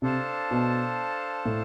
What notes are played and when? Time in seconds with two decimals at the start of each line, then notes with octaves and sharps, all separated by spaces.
0.02 C3 D4 A4 C5 F5 A5
0.51 B2
1.46 A2